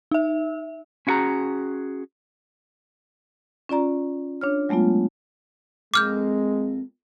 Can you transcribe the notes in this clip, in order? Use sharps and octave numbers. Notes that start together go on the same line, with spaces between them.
D#4 E5
C#4 E4 F#4 G#4 A#5
C#4 F4 D5 A#5
D4 C#5 F6
F#3 G#3 A3 B3 F4
F2 G#3 A#3 D6 F6 G6